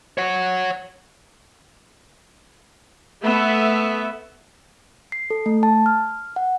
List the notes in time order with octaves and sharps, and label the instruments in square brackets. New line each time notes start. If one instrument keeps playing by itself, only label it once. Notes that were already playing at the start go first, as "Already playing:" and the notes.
[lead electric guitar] C#5 F#5
[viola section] A3 B3 E5
[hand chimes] C7
A4
A3
A5
F6
F#5